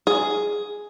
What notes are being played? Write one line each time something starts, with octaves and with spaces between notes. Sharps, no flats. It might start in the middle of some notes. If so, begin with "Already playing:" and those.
G#4